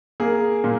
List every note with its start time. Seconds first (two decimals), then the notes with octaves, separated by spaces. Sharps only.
0.20 A#3 G#4
0.64 A#2